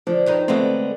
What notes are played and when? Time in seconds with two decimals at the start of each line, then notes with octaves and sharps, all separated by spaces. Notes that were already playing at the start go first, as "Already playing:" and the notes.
0.07 D3 F3
0.26 G2 D#3 D#4
0.48 D3 G#3 A3 B3 C4